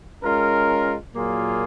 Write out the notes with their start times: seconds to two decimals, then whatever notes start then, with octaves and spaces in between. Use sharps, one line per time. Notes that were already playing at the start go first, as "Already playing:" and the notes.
0.23 G#3 C#4 F4 A#4
1.14 A#2 F#3 A#3 F4 G#4